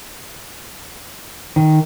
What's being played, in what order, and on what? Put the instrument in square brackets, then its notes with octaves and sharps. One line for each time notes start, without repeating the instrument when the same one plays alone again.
[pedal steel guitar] D#3